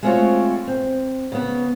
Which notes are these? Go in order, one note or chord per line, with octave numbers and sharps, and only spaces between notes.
G#3 A3 C4 F4 F#4 C#5
C4
C#3 B3